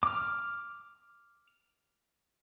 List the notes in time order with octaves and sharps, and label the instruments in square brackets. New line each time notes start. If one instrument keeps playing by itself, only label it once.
[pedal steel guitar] D6 F6